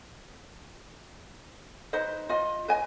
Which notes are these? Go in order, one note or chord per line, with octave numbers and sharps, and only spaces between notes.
D#4 B4 C5 D#5
F4 D#5
B4 D#5 G#5